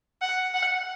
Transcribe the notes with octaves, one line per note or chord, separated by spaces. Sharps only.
F#5
F#5